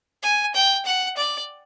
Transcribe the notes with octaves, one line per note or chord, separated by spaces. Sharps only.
G#5
G5
F#5
D5